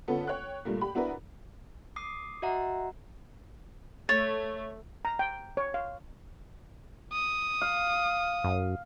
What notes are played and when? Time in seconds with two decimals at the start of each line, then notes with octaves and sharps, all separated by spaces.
0.08 D3 B3 C#4 F4 A4 B4
0.27 C#5 G5 F#6
0.65 G2 A#2 A3 A#3
0.81 G4 B5
0.95 B3 D4 E4 F#4 A#4 B4
1.96 D6 D#6 C7
2.42 F#4 D#5 E5 F#5 A#5
4.09 A3 C#5 A6
5.05 A#5
5.19 G5
5.57 C#5
5.74 F5
7.13 D#6
7.61 F5
8.44 F#2